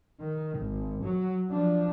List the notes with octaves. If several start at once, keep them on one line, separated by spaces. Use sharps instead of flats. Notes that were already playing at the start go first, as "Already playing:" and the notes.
D#3
G#1
F#3
F3 D4